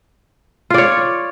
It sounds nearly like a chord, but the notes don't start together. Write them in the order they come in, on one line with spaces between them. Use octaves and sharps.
F4 D5 C#5